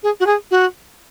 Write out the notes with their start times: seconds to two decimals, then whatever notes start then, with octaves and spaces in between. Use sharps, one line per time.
0.03 G#4
0.20 F#4
0.26 G#4
0.51 F#4